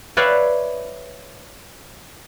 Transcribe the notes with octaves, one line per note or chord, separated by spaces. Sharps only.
B4 C#5 D5 E5 F5 G5